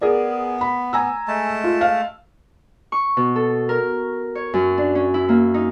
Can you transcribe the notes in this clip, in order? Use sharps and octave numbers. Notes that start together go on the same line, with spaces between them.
B3 G#4 A#4 D5
B5
G#5 A#5 E6
G#3 A3 A5
F4
F5
C#6
B2
A4
A#4
C#5
F#2
D4
C#4
E4
A#3
D#4